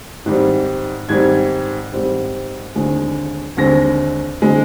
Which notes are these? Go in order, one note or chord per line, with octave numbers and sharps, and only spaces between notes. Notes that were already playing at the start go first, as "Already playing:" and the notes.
G#2 D#3 G3 C4
G#2 D#3 G3 C4 G#6
G#2 D#3 G3 C4
D#2 D3 G#3 C4
D#2 D3 G#3 C4 A#6
D3 G#3 C4